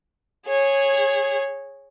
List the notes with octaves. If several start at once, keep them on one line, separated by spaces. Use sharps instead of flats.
G#4 C#5